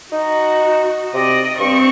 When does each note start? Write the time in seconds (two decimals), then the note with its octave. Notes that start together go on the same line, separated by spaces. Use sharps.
0.12 D#4 F#4
1.14 C3 D5 D#5
1.59 G2 C4 C#6